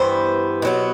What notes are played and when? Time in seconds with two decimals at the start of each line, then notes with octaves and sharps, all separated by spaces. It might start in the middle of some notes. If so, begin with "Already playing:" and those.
Already playing: G2 E3 B3 C5
0.62 B2 F#3 B3